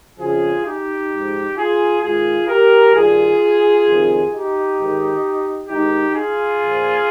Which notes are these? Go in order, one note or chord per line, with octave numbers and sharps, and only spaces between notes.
F2 C#3 F3 F4 G#4
D#4 G4
G#2 F3
F4 G#4
G#2 D#3 F4 G#4
G4 A#4
G2 D#3 F4 G#4
F2 C3 D#3
D#4 G4
G#2 D#3
G#2 D#3 D#4 G4
F4 G#4
A#2 F3